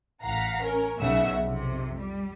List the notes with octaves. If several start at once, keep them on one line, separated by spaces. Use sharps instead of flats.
A1 F5 F#5 A#5 B6
C#4 A#4
B1 C#3 E5 F#5 E6
F2 C3
G3